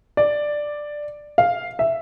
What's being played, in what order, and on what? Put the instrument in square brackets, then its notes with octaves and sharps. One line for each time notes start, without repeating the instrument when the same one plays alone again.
[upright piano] D5
F5
E5